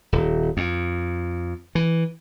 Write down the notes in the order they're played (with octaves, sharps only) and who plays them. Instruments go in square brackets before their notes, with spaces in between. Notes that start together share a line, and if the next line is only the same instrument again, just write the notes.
[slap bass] D#1
F2
E3